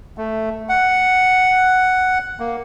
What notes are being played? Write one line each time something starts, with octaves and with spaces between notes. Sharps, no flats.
A3
F#5
A#3